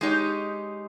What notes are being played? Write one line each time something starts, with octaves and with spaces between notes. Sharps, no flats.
G#3 D#4 G4 C#5